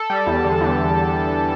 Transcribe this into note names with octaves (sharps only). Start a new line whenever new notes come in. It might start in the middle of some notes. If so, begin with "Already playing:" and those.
Already playing: A4
G3
E2
D3
E2